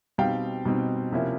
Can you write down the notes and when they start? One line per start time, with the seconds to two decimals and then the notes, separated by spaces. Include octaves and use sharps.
0.18 B2 G3 C4 D#4 F5 G5
0.65 B2 G3 C4 D#4
1.12 C3 F3 A#3 C#4 E4